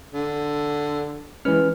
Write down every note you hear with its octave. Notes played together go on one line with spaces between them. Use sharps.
D3
E3 G#3 C#4 B4 F6